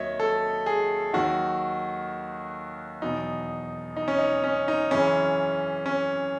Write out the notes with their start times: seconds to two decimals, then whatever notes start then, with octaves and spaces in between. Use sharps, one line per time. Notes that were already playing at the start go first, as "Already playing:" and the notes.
Already playing: D#2 D#3 F#3 C#5 D#5 E5
0.20 A4
0.66 G#4
1.13 D#2 D#3 F#3 F#4
3.02 E2 B2 F#3 D#4
3.97 D#4
4.08 C#4
4.19 D#4
4.44 C#4
4.68 D#4
4.91 F#2 C#3 E3 C#4
5.86 C#4